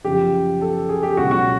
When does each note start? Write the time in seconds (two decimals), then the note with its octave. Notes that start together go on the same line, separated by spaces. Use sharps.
0.04 F#2 C#3 F3 G4
0.61 A4
0.89 G#4
1.03 G4
1.17 C#2 B2 F#3 F#4
1.31 F#4